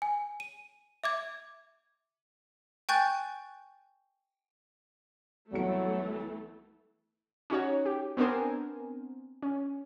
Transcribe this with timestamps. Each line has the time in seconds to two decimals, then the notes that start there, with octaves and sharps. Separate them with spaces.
0.02 G#5
0.40 D#7
1.04 E5 D6 G#6
2.89 G5 G#5 C#6 F#6 G6 A6
5.52 C2 E3 F#3 A3 B3 C#7
7.50 C#4 D#4 F#4 C#5
7.86 G4
8.17 B3 C4 D4 A#4 C5 G#5
9.43 C#4